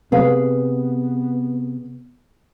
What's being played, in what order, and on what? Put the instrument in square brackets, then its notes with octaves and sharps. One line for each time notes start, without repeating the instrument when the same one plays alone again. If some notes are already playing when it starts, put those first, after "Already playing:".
[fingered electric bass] C3 [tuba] B3 [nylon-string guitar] G#4 B4 F5